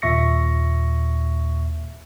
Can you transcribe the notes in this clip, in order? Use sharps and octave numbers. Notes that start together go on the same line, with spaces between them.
D#2 A#2 E5 C#6 A#6 C#7